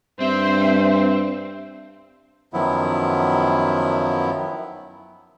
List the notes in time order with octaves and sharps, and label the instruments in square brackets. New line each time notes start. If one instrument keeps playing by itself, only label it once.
[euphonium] G2 [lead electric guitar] C4 [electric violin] C5 [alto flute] E5
[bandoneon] F#2 D#3 F3 F#3 B3 E4